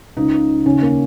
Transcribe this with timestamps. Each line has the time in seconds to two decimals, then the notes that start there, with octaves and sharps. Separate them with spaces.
0.17 C#2 C#3 D#4
0.66 D#2 C#3 C#4
0.82 A#3